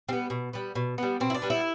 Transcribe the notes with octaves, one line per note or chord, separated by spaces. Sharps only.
G3 B3 C4
B2
G3 B3
B2
G3 B3
B2 C4
E4
D4
G3 B3
E4